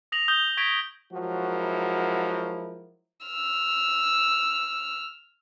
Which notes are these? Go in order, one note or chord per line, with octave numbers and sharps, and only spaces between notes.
D#6 A#6 F7 F#7
D#6 G6 G7
C#6 G#6 A#6 B6 D7 F7
F3 F#3 G#3 E4 F#4 A#4
E6 F6